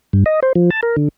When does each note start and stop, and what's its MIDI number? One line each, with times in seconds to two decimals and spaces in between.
0.13 0.24 43
0.26 0.40 75
0.43 0.53 72
0.55 0.70 53
0.70 0.81 81
0.83 0.96 70
0.97 1.08 50